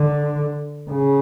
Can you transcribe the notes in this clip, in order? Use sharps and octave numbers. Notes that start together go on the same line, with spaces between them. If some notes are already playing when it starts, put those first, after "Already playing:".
Already playing: D3
C#3